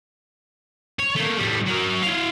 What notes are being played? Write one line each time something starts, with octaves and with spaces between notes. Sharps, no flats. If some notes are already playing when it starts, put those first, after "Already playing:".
C#5
A3 A#3
A2 G3
F#3 A#4
E4 F5